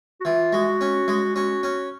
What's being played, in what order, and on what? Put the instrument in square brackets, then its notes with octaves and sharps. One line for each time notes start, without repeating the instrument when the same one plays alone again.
[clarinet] F#4
[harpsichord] E3 [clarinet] F4
[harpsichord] G#3 [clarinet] F#4
[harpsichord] C#4
G#3
[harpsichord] C#4 [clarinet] F#4
[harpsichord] C#4